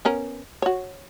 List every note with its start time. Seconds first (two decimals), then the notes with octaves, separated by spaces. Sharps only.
0.05 B3 C#4 A#4
0.62 F#4 C#5